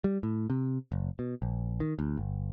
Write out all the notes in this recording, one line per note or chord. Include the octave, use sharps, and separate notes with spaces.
G3
A2
C3
F#1
B2
A#1
D#3
D2
G1